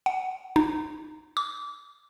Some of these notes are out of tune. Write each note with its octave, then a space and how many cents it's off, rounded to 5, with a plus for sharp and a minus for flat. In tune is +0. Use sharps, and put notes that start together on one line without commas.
F#5 +15
D#4 -15
D6 -25